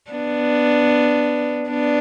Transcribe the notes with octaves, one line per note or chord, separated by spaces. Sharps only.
B3 D4
B3 D4